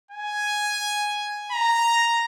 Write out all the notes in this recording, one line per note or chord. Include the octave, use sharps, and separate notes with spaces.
G#5
A#5